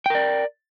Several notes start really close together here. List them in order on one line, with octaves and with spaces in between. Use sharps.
G5 A#4 D5